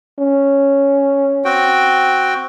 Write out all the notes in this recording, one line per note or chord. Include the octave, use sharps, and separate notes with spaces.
C#4
C4 F#4 G5